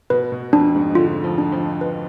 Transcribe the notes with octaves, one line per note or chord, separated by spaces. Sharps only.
B2 B4
B2
F2 D4
G#2
D3 F4
F3
D4
F3
B4